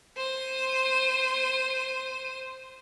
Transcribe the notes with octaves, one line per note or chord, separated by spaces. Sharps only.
C5 D#7